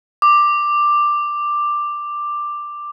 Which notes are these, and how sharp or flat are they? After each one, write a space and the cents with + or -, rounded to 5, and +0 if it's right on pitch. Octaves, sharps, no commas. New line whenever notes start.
D6 +10